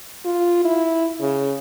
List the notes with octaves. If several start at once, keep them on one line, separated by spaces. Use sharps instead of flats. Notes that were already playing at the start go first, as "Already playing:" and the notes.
F4
E4
C#3